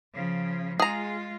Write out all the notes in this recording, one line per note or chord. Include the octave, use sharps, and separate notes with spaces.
C#3 F3
G#3 F4 G#4 A#5